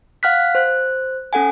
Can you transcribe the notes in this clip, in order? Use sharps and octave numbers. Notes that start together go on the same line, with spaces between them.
F5 F#5 F6 F#6 B6
C5 F#6
C#4 A4 F#5 G#5